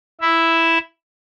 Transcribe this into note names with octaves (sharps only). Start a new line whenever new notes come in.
E4 E5